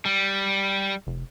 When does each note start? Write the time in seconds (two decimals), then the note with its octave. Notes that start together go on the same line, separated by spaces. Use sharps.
0.05 G3
1.07 F1